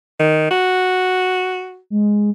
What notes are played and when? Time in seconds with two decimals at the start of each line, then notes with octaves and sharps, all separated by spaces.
0.19 D#3
0.51 F#4
1.90 G#3